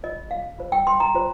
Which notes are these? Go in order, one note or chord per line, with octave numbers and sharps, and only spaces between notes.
F4 C5 D#5
F5
F4 C5
G5
C6
A#5
F4 C5